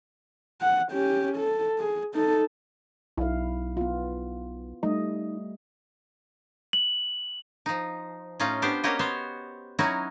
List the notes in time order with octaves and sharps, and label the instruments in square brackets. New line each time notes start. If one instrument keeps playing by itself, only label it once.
[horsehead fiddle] F#5
C#4 G4
A4
G#4
D#4 A4
[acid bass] B1 [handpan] E4 F5
[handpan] B3 F4
[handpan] G3 A3 D#5 [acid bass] D#4
[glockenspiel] F#7
[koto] F3 D#4
A2 C#4 D#4 F4
B3 D4 G4 C5
A#3 C#4 F#4 G4 C#5 D#5
B3 C5 C#5
F#3 C#4 D#4 E4 F#4